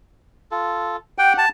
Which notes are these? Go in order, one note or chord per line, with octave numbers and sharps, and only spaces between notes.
F4 A4
G4 F#5 G5
A5